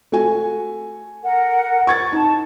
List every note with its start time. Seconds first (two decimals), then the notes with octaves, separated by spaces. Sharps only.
0.12 A3 F#4 G#5
1.23 A#4 F#5
1.87 C#6 G#6 A6
2.12 D#4 A5